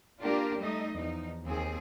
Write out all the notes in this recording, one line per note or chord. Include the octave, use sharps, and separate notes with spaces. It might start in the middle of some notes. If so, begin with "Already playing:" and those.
A#3 D4 F4 G4 A#4
G3 A3 D#4 D#5
E2 F3 D#4
D#2 C4 G#4